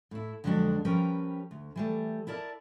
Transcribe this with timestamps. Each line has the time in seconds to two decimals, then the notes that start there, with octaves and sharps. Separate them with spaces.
0.11 A2 E4
0.44 F2 D3 F#3 G#3 C4 D4
0.85 F3 G3 C#4 A#4 B4 G5
1.51 D2
1.76 E3 G3 A3
2.27 E4 A#4 D5 A5